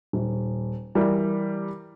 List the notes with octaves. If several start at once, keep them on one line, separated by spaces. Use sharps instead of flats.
D#1
E3 G3 A#4